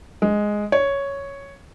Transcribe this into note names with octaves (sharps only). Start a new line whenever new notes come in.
G#3
C#5